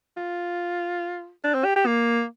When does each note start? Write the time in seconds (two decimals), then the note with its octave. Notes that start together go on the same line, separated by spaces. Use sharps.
0.17 F4
1.44 D4
1.54 C4
1.64 G4
1.76 G4
1.86 A#3